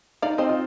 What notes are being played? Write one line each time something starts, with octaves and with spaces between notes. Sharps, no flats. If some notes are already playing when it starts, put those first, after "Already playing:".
D#4 D5 F5
C4 C5 D#5
F4